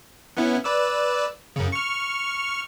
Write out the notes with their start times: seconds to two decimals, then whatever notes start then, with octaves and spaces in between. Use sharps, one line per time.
0.37 B3 C#4 E4
0.64 B4 D5 E6
1.56 F#2 C#3
1.72 C#6 F6